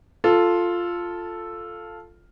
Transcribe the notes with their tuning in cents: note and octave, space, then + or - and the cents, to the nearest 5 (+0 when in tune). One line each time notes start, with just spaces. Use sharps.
F4 +0 A4 +0